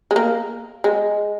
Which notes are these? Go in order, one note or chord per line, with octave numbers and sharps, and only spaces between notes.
G#3
A#3
G#3